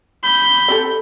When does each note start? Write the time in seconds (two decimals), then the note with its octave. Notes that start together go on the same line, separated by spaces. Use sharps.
0.24 B5 G6
0.68 C4 G4 A4